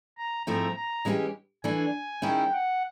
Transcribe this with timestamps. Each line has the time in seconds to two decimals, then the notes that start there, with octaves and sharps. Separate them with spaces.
0.17 A#5
0.46 G#2 F3 A3 C4 E4 A#5
0.76 A#5
1.05 E3 G#3 C#4 E4 G4
1.64 E3 A3 D4 G#5
2.22 D#3 G#3 C#4 E4 G5
2.51 F#5